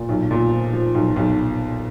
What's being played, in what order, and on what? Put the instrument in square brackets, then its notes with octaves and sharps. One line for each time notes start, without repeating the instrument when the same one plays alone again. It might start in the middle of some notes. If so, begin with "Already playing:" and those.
Already playing: [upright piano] A#2
B1
A#2
F3
F3
B1
B1